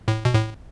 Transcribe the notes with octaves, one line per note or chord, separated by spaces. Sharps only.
A2
B2
A2